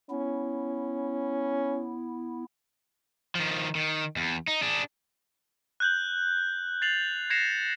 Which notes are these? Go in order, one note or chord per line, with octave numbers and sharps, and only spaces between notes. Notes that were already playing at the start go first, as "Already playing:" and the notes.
B3 C#4 E4
D#3 F3
D#3
E2
D#4
D4 G#4
F#6 G6 F#7
A6 C7 F7 F#7
G#6 A#6 C7 C#7 E7 F7